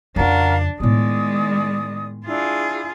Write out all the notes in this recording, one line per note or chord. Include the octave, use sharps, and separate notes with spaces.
F2 C#3 D4 F#4 A#4 F5
A2 D#3 G#3 B3 D5 D#6
D4 E4 F4 G#4